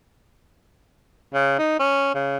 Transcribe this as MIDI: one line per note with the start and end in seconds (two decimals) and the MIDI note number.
1.34 1.57 49
1.59 1.79 63
1.80 2.12 61
2.14 2.38 49